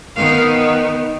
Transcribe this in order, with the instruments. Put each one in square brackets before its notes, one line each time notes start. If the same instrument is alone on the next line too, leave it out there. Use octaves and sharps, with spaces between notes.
[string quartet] D#3 B3 D#4 F5